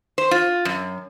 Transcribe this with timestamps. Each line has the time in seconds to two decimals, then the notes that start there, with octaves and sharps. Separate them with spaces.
0.18 C5
0.31 F4
0.65 F#2